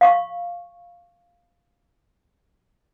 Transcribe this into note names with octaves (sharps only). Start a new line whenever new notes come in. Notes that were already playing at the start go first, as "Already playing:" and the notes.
F5 C#6